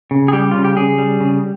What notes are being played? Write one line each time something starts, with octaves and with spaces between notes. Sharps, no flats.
C#3
G#4
G3 G4
C#3 F4
G4
C#3 G#4
G3
C#3